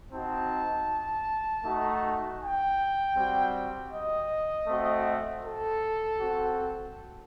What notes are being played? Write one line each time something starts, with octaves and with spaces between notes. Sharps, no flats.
C4 D#4 F#4 A5
A3 D#4 F#4
G5
G3 C4 F#4
D#5
A3 C4 F#4
A4
C4 F#4